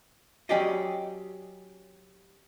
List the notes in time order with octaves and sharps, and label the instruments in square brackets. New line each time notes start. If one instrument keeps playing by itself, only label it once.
[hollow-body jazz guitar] F#3 C#4 G4 G#4 D5 D#5